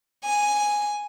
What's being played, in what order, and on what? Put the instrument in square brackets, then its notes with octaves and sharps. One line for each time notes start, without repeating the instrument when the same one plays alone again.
[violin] G#5